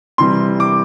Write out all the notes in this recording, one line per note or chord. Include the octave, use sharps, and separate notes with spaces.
C3 E3 G3 C6
D6